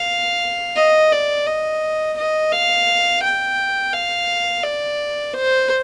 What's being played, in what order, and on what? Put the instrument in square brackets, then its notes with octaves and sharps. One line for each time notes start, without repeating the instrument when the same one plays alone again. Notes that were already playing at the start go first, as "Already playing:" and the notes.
Already playing: [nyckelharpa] F5
D#5
D5
D#5
D#5
F5
G5
F5
D5
C5